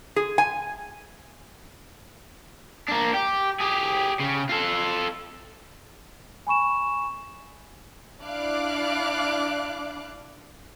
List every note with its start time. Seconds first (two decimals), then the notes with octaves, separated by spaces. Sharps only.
0.16 G#4
0.38 G#5
2.88 A#3 D4
3.13 G4
3.60 G4 G#4
4.20 C#3
4.49 F4 A4
6.47 G#5 B5 C#6 E7
8.22 D4 E4 D5 F5 D6 F#6